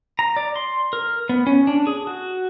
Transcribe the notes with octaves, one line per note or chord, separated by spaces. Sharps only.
A#5
D5
C6
A#4
B3
C#4
D4
G#4
F#4